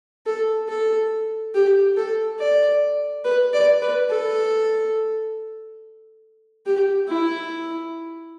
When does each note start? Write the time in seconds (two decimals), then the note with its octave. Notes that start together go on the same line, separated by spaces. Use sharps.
0.26 A4
0.69 A4
1.55 G4
1.97 A4
2.40 D5
3.25 B4
3.53 D5
3.82 B4
4.10 A4
6.66 G4
7.08 E4